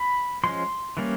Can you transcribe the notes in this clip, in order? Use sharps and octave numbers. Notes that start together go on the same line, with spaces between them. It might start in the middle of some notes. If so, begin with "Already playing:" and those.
Already playing: B5
F3 G#3 C#4 C6
E3 G3 A#3 C#4